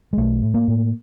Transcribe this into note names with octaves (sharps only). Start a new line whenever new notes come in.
G#3
B1 A3
A2
A#3
A2